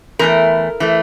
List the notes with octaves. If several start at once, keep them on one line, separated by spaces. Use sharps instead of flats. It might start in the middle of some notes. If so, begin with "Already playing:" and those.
E2 E3 A3 A#4
E3 A3